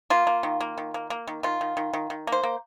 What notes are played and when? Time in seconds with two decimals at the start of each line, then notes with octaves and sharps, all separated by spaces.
0.10 A#3 F4
0.27 A#3
0.43 D#3
0.61 A#3
0.78 D#3
0.94 A#3
1.10 A#3
1.27 D#3
1.43 D#3 F4
1.61 D#3
1.77 D#3
1.93 D#3
2.10 D#3
2.27 A#3 C5
2.43 A#3